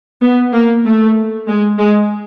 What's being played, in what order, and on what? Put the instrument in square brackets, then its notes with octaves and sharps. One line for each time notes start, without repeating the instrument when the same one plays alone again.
[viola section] B3
A#3
A3
G#3
G#3